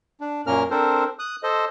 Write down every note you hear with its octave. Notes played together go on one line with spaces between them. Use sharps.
D4
F#2 A#2 A#3 C#4 A#4 F6
C4 D4 A4 A#4 C5
D#6 F#6
A4 C5 D#5